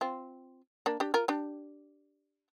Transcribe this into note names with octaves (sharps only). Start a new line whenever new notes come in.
C4 F4
A#3 D4
D4 G4
F4 A#4
D4 G4